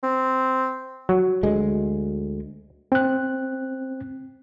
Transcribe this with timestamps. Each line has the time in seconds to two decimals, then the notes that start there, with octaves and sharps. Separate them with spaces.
0.03 C4
1.09 F#3
1.43 D2 G#3
2.92 C4 F#6